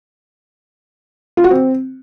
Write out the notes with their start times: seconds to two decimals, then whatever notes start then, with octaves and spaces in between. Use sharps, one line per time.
1.37 F4
1.44 F#4
1.51 C4